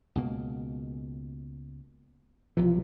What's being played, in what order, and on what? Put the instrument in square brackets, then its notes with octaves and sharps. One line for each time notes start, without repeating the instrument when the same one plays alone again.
[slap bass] C#2 B2 A#3
[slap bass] B1 C3 E3 [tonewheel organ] F3